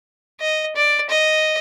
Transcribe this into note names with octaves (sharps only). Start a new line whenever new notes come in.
D#5
D5
D#5